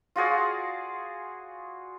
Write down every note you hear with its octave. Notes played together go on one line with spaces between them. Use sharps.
F4 F#4 G#4 D5